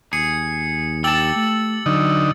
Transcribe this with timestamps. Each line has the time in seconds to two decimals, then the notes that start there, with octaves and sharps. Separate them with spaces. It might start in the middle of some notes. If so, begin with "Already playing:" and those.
0.13 D#2 G#4 C#7
1.04 G4 A5 E6 A6 F#7
1.36 A3
1.86 D3 F#3 D#4